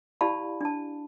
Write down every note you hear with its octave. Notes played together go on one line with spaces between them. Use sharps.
E4 G4 D5 F5 A5 B5
D4 A5